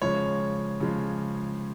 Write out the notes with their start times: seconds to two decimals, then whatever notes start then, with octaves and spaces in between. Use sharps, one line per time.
0.02 C#3 F3 G#3 C#5
0.80 C#3 F3 G#3